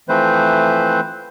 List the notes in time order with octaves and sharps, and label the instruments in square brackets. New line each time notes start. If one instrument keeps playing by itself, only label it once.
[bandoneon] E3 F3 A3 C4 B4 C5